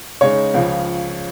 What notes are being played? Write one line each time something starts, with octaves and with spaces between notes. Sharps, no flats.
C#3 G#3 D#4 C#5
C#2 C#3 F3